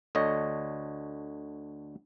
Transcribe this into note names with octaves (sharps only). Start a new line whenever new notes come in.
D2 D3 C#5 D#5